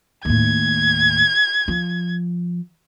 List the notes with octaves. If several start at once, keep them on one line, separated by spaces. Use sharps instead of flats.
D#2 A2 G#6
F3